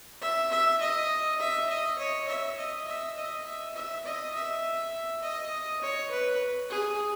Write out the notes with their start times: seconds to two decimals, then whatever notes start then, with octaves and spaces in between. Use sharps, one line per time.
0.22 E5
0.51 E5
0.81 D#5
1.40 E5
1.69 D#5
1.99 C#5
2.28 E5
2.58 D#5
2.87 E5
3.16 D#5
3.46 E5
3.75 E5
4.05 D#5
4.34 E5
5.22 D#5
5.81 C#5
6.11 B4
6.70 G#4